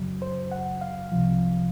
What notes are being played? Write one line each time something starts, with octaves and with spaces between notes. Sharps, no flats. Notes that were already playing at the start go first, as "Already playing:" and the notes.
Already playing: F#2 C#3 F#3
C5
F#5
F5
C2 C3 F3